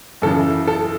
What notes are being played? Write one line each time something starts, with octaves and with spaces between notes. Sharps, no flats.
F#2 C#3 E3 A4
A4